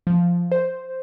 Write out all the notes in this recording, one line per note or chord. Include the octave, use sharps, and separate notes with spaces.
F3
C5